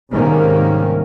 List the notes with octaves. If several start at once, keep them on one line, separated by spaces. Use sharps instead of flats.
C2 G#2 C3 D#3 A#3 C#4